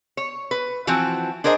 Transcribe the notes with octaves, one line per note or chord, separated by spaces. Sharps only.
C#5
B4
E3 F3 C4 F#4
D4 G#4 A#4 C5 D#5